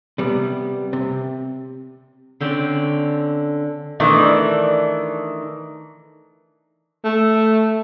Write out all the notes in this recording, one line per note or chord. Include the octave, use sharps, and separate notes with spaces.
C3 G3 B3
C3
D3 C4 C#4 D5
D#3 E3 A3 D4
A3